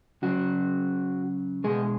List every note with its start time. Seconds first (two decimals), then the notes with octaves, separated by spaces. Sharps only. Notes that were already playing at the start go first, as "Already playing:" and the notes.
0.23 C#3 F#3 F#4
1.64 B2 G#3 G#4